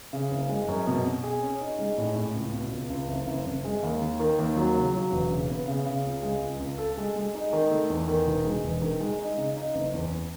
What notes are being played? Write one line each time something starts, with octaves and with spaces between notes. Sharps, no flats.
C#3
F#1
G#3
F#2
B2
B2
G#4
C#4
D#4
G#3
A2
A2
C#2
B2
C#2
C#2
F#1
F#1
F#1
G#3
D#2
D#3
D#3
D#2
F#3
C#3
F#3
E1
C#3
B3
C#3
C#3
C#2
G#3
C#2
C#2
A4
G#3
G#3
D#4
D#3
A3
E2
D#3
E1
G#3
E1
D#3
G#3
D#4
C#3
D#4
F#1
E2